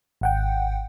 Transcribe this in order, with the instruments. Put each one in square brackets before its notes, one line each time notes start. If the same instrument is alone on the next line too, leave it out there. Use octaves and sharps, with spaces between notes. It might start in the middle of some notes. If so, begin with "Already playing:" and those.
[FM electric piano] G#1 F#5 G5